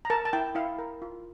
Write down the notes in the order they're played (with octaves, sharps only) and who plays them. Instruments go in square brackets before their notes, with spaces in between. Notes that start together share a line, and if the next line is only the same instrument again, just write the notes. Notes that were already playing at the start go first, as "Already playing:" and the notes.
[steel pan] A#5
A#4 A5
A5
E4 G5
E4 F5
A#4
F4